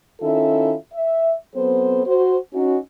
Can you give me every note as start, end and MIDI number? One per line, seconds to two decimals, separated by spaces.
0.22 0.74 51
0.22 0.74 61
0.22 0.74 64
0.22 0.74 65
0.22 0.74 69
0.22 0.74 76
0.93 1.33 76
1.54 2.01 54
1.54 2.01 59
1.54 2.01 60
1.54 2.01 69
1.54 2.01 72
2.06 2.37 66
2.06 2.37 72
2.53 2.76 61
2.53 2.76 63
2.53 2.76 66